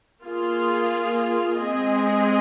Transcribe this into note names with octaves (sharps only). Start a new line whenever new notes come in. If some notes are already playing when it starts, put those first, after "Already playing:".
A#3 F4 G#4
G#3 C4 G#4 D#5